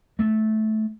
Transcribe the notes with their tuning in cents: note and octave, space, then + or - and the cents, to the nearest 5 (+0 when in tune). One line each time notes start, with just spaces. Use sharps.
A3 -15